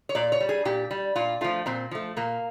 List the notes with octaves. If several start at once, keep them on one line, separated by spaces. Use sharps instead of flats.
C#5
A#2 D5
C#5
G3
G#4
A#2 G4
G3
A#2 F4
F3 A3 F4
A#2 C4
F3 A3
A#2 A#3